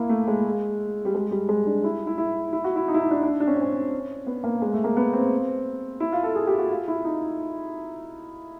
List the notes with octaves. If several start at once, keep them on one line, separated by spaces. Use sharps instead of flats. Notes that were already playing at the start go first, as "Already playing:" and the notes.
Already playing: A#3 E4
A3
G#3
G3
G#3
G3
G#3
D4
E4
E4
E4
E4
F#4
E4
D#4
E4
D#4
D4
D4
D4
C#4
C4
C#4
B3
A#3
G#3
A3
A#3
B3
C4
E4
F4
A4
G#4
G4
F#4
F4
E4
D#4